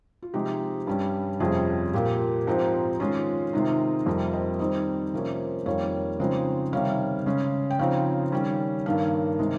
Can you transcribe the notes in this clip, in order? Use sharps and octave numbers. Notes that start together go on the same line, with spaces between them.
F4
C3 F3 G#3 D#4 G4
G2 G3 C#4
F2 C3 G3 C#4 F4 G#4
A#2 F3 A#3 G4
G#2 F3 C4 D#4
D#3 G#3 C#4 F4
C3 D#3 G#3 D#4
F2 C3 G3 A#3
C5 D#5
D#3 G3 C4 D#4 C5 D#5
C3 F3 A#3 C#4
F2 D#3 G3 A#3 C#5 F5
C#3 F3 G#3 C4 D#4
C3 D#3 G3 C#5 F5
C#3 G#3 C#4
G5
C#3 F3 C4 D#4 C#5 F5
D#3 G3 C#4
G2 D#3 A#3 C#5 F5
C3 D#3 G#3 D#4